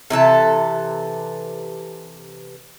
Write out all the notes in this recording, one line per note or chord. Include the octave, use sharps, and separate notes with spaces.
C3 E3 A4 A5